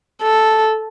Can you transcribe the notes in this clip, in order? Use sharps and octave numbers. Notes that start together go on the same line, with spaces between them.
A4